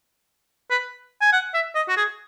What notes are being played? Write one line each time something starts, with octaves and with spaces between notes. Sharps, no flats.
B4
G#5
F#5
E5
D#5
F#4
G#4